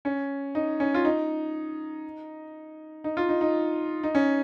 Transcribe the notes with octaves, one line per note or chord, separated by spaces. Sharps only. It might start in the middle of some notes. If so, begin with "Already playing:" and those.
C#4
D#4
C#4
F4
D#4
D#4
F4
D#4
D#4
D#4
C#4